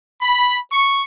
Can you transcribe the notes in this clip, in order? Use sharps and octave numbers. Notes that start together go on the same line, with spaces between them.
B5
C#6